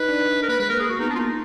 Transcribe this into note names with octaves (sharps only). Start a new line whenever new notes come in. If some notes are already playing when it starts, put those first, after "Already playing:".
Already playing: D#4 B4
D4
A#4
A#3 B4
G#3 B4
A#3 A#4
G#4
A#3 F#4
B3 D#4
B3 D4
F4
A#3 D#4